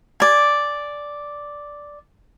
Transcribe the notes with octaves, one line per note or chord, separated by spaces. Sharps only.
D5 G#5